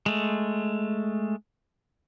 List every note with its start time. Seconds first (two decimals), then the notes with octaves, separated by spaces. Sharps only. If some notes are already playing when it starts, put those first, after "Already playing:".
0.06 G#3 A3